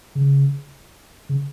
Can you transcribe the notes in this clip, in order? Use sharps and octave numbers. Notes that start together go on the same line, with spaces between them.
C#3
C#3